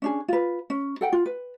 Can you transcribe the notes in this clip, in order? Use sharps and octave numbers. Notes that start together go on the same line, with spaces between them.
C#4 D4 G#4
F4 B4
C#4
A4 F#5 G5
F4
B4